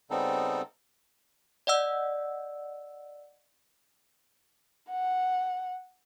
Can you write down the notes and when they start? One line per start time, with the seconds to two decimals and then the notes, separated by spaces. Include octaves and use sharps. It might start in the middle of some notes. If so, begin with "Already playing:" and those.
0.11 C#3 G3 B3 C4 D#4 A4
1.67 D5 D#5 F#5 E6
4.90 F#5